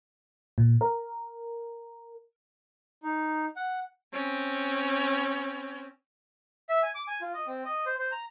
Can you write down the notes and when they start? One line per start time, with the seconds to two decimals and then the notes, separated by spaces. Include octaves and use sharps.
0.58 A#2
0.81 A#4
3.03 D#4
3.56 F#5
4.13 C4 C#4
6.69 E5
6.83 G#5
6.95 D6
7.08 G#5
7.21 F4
7.34 D#5
7.47 C4
7.65 D#5
7.86 C5
7.98 C5
8.12 A#5